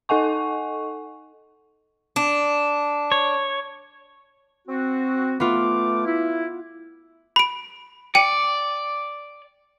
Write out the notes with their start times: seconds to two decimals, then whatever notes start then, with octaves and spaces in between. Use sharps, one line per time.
0.09 D#4 A4 D#5 F#5 G#5 C#6
2.16 D4
3.12 C#5
4.68 C4 F#4
5.40 A3 B3 F4 D6
6.05 E4
7.36 B5 D7
8.15 D5 G5 C#7 D#7